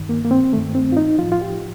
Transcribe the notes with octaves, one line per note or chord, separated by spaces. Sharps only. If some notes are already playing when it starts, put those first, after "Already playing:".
Already playing: G2 D#3
A#3
A#3
C4
G2 D#3 A3
C4
F4
D#4
A2 F3 F4
F4
G4